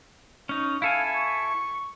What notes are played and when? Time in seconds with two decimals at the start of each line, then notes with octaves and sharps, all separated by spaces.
0.49 C#4 D#4
0.82 E4 A4 F5 G#5
1.15 C#6